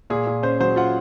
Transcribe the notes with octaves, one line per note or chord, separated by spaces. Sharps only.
A#2 G#4
A#2
C#4 C5
F#3 C5
F4 F#5